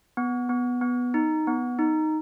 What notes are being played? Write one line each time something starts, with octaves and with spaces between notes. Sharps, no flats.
B3
B3
B3
D#4
B3
D#4